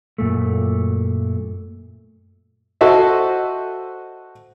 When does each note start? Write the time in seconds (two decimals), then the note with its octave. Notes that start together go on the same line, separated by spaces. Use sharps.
0.18 F#2 A#2 A3
2.81 F#4 A4 C5 D#5 E5